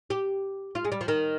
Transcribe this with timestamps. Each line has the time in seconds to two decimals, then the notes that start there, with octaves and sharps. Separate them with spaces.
0.10 G4
0.75 F4
0.85 G#3
0.92 G3
1.01 F3
1.08 D#3